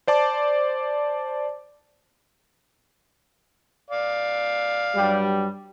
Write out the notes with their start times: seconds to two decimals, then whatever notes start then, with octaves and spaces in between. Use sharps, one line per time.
0.08 C5 D5 A5 D6
3.90 D5 F5
4.95 G2 F#3 G3